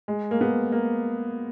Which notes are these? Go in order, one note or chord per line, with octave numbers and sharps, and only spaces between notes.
G#3
A#3
B3
A#3